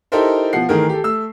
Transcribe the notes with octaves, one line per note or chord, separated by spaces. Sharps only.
D#4 E4 G4 A4 A#4 C5
B2 F3 F#5 C7
D#3 E3 A3 G#4 A#4
G4 A4
A3 E6